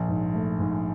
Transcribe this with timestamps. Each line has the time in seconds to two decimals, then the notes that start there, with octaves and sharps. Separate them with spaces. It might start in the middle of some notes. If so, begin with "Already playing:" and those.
Already playing: A#1
0.08 G#2
0.34 A3
0.59 G#2